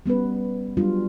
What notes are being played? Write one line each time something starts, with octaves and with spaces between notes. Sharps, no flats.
G3 B3 C#4 B4
F#3 G3 D4 F4